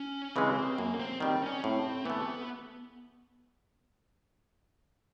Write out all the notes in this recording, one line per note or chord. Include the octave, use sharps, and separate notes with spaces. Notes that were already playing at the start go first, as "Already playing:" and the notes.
Already playing: C#4
C#3 E3 G#3 C4 C#4
F#2 A#3
C4
D#3 G3 C4
C#4
A2 C4
E3 A3 B3